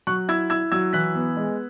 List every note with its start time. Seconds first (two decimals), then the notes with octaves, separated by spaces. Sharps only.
0.07 F#3 C#6 F#6
0.29 E4 E6 G#6
0.50 E4 E6 G#6
0.72 F#3 E6 G#6
0.93 E3 F#6 B6
1.15 B3
1.37 G#3